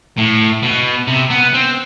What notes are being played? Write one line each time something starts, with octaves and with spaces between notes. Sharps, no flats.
A2
B2
C3
B3
C4